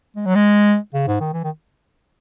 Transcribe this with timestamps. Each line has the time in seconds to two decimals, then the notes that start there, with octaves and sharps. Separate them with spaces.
0.16 G#3
0.25 F#3
0.35 G#3
0.94 C#3
1.07 G#2
1.20 D#3
1.33 E3
1.44 D#3